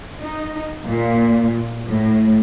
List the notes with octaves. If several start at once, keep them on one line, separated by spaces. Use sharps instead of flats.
D#4
A#2
A2